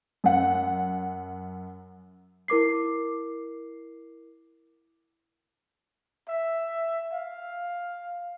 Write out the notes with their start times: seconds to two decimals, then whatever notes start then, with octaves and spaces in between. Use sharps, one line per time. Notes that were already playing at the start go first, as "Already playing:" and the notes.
0.24 F#2 F#5
2.48 E4 A#4 D6 C7
6.29 E5
7.12 F5